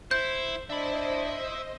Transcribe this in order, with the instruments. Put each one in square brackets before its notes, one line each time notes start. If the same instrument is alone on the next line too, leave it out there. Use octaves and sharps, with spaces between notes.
[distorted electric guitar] E4 [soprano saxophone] C5 [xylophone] G6
[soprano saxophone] D4 [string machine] C5 D#5 [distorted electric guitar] E5 B5